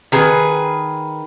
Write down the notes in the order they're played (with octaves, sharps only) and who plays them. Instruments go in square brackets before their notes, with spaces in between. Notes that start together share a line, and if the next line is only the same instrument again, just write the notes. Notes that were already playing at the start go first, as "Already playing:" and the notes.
[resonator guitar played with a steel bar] D#3 G#4 B4